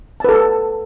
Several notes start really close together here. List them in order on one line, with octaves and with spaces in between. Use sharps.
A5 B4 A4